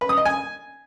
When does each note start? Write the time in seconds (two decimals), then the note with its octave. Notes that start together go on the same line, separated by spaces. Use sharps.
0.01 B4
0.09 D#6
0.17 D#5
0.25 G#5